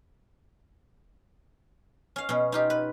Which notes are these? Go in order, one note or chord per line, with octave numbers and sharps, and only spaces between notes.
C#4 F5
B2 C#4
D#4 F4 G4
B4